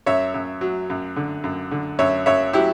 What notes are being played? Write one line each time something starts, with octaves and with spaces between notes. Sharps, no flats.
F#2 C#5 E5
F#2
F#3
F#2
D3
F#2
D3
F#2 C#5 E5
F#2 C#5 E5
F#3 E4 G4